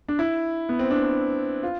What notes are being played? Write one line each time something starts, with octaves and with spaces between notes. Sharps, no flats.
D4
E4
B3
C4
D4
F4